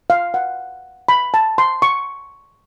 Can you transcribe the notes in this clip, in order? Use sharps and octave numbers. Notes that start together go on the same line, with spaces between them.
F5
F#5
B5
A5
C6
C#6